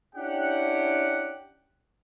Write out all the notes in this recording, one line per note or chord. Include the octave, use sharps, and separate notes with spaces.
C#4 D4 E4 G4 F#5